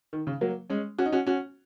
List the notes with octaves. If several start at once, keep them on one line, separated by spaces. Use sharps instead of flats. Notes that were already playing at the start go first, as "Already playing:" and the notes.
D#3
C#3
F#3 A#3
G#3 C#4
C#4 F#4
D#4
C#4 F#4
C#4 F#4